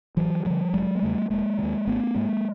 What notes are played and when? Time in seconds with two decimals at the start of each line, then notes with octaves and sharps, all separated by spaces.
0.17 A1 E3 F#3
0.45 G2 D3 F3 G3
0.73 F1 F#3 G#3
0.96 A#3
1.02 E2 C#3 G3 A3
1.30 E1 G#3 A#3
1.59 D3
1.63 D#2
1.87 G#1 A3 B3
2.15 G#2 G#3 A#3